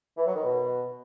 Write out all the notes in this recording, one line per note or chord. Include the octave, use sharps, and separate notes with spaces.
E3
F#3
D#3
B2